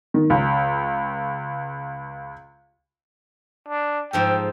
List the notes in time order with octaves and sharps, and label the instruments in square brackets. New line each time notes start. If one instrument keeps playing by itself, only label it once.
[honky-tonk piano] D#3
C#2
[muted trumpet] D4
[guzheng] G#2 F3 A4 [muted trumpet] G5